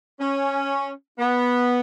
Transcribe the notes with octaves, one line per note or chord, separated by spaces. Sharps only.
C#4
B3